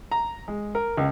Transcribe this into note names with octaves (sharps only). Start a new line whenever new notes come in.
A#5
G#3
A#4
C#2